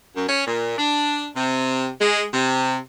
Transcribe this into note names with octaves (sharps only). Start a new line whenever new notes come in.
F#2
C#4
A#2
D4
C3
G#3
C3